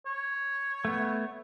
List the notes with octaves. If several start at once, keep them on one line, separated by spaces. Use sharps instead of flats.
C#5
A3 B3